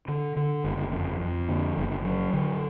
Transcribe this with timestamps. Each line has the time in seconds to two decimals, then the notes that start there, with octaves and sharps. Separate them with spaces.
0.08 D3
0.37 D3
0.64 F#1
0.93 F2
1.20 F2
1.49 D3
1.77 F#1
2.05 F#3
2.33 D3